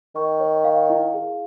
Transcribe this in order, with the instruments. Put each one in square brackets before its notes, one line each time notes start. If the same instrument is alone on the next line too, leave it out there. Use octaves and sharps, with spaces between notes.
[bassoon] D#3 [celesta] C#6
[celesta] C#5
F5
E4
G#4